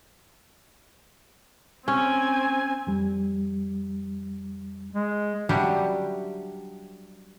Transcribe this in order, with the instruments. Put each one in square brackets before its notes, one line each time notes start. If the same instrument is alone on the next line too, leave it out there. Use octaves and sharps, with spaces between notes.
[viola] C4 G#5 [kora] C#4
[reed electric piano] F2 G3
[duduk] G#3
[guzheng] F#3 G3 D4 E4 G4